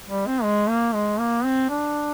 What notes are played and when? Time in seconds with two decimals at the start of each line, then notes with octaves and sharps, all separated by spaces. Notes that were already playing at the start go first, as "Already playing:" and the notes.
0.09 G3
0.27 C4
0.43 G#3
0.69 A#3
0.94 G#3
1.19 A#3
1.44 C4
1.70 D4